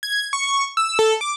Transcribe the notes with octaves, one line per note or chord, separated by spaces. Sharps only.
G#6
C#6
E6
A4
D6